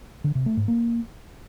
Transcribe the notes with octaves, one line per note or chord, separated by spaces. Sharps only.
D3
C3
A3
G#2
A#3